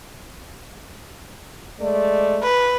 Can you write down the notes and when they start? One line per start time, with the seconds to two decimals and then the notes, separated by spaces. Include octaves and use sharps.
1.80 G#3 A3 D5
2.43 B4